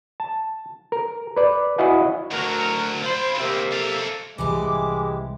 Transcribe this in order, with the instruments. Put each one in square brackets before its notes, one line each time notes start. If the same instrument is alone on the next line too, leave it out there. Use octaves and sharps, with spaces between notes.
[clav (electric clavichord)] A5
A#4
B4 D5
E4 F#4 D#5 F5 F#5 G#5
[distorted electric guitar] D2 F#3 [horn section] F#4 A#4
[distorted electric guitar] F4 B5 [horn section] C5
[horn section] C3 A#3 E5 [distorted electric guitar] C4 D#4
[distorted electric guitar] A4 F5
[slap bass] C2 A2 [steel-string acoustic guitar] E3 E4 G4 [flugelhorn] G#3 [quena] D6